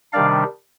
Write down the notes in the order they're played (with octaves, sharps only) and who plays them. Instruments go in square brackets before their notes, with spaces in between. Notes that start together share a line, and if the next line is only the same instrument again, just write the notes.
[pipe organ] C3 D#3 G3 D4 D5 F5